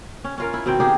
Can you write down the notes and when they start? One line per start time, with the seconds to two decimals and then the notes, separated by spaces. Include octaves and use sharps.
0.24 C#4
0.38 C#4 F4 A#4
0.54 E4
0.66 B2 D#3 C4 G5
0.80 A#3 D#4 G4 G#4